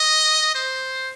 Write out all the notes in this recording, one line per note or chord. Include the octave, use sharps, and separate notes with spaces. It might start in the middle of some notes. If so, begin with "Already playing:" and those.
Already playing: D#5
C5